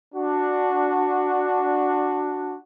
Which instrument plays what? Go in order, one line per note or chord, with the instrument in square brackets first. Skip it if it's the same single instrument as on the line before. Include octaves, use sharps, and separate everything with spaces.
[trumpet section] D4 F#4